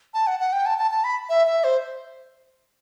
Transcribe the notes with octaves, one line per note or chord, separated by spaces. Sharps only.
A5
F#5
F#5
G5
A5
A5
A5
B5
E5
E5
C5